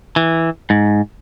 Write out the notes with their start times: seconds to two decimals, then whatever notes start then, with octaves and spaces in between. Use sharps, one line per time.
0.16 E3
0.70 G#2